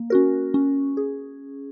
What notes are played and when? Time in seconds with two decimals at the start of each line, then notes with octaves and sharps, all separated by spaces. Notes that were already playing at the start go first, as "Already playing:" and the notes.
Already playing: A#3
0.10 C#4 F#4 A#4
0.54 C#4
0.97 G#4